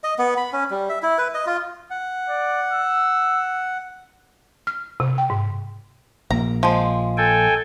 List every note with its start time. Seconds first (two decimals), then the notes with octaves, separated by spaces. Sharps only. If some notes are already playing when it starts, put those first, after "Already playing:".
0.04 D#5
0.19 B3
0.37 B5
0.53 C#4
0.70 G3
0.89 E5
1.03 E4
1.18 B4
1.34 D#5
1.46 F4
1.90 F#5
2.29 D5
2.72 E6
4.67 F6
5.00 C3
5.18 G5
5.30 G#2
6.31 A#1 A#3 A#5
6.63 F3 G#3
7.17 A4 G5 G#5